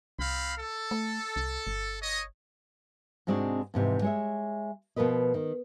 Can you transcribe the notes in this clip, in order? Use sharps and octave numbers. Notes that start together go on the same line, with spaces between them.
C2 C4 F5 B5
A4
A3
C2
G1
C#5 D#5
G#2 C3 G#3 C4 D4 F#4
F2 G#2 C3 E3
G#3 C#5 E5
B2 F3 A#4 B4 D#5
D#3